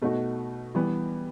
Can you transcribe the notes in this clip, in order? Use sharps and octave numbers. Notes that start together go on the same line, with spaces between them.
B2 A3 D#4 F#4
E3 G3 B3